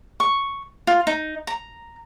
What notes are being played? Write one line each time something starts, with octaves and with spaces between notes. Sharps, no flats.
C#6
F4
D#4
A#5